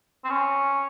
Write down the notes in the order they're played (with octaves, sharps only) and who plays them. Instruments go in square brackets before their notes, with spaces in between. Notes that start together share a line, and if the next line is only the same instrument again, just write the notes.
[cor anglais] C4
C#4